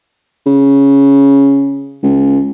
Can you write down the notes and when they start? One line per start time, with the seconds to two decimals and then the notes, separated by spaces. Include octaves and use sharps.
0.46 C#3
2.03 C#2